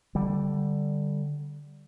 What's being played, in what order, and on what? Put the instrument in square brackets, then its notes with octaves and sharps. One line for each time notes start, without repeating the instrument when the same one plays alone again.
[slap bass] D3 G3